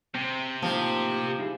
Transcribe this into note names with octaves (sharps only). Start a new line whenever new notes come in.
C3 C4
A2 F3 A#3 D#4 G4
D#4 E4 G#4